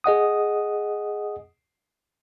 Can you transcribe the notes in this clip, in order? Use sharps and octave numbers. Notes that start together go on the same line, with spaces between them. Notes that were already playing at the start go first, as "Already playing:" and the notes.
G#4 D#5 F#5 D#6